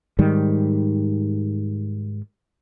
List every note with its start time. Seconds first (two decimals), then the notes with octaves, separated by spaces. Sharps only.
0.19 G#2 D#3 G3